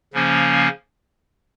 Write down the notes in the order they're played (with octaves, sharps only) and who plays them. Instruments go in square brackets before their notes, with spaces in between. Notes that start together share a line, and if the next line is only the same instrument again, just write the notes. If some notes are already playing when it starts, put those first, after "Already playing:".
[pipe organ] C#3 F3 A#3 C#4